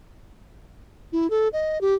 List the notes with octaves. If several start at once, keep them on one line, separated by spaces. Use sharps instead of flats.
E4
A4
D#5
G4